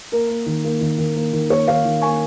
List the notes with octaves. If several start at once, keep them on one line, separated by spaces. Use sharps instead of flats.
A#3 A#4
A#3
D#3
A#3
D#3
D#3
A#3
D#3
A#3 C#5
D#3 C#5 F5
D#3
A#3 G#5 C#6